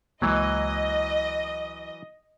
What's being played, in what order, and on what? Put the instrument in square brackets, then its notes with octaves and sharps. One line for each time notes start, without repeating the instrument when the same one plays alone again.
[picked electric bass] C#2 G#3 A#3 [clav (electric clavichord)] E3 F#3 [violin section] D#5